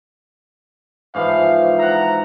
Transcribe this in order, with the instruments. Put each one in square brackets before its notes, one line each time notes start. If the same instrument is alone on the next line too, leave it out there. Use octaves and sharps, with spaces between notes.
[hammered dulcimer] G#2 E3 F3 [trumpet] F5
[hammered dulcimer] E5 F#5 [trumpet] A#5